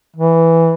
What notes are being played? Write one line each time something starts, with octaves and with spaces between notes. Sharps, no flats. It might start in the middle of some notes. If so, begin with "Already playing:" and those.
E3